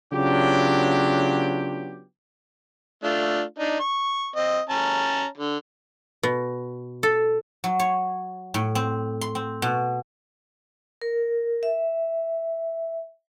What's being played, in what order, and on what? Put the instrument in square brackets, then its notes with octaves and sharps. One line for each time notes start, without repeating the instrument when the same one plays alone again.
[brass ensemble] C#3 F#3 B3 D4 F4 G4
[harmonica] A3 D4 F4
D4 D#4
C#6
C4 D#5
C#4 A5 A#5
D3
[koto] B2
A4
[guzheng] F#3
C#5
A2
C4
C6
C4
B2
[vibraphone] A#4
E5